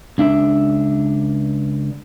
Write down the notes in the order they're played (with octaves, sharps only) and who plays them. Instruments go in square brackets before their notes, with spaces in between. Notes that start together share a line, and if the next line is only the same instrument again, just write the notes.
[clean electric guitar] C#2 D4 E5